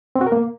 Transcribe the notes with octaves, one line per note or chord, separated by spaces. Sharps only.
C4
F#4
A#4
A#3